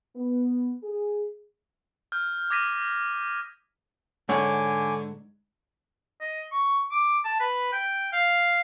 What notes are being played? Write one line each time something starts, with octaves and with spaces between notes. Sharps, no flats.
B3
G#4
F6 G6
D6 D#6 G#6 A#6 B6 D#7
G#2 D3 C#5 F#5 G#5 D6
D#5
C#6
D6
A5
B4
G5
F5